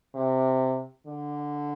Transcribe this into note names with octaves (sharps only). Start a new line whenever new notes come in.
C3
D3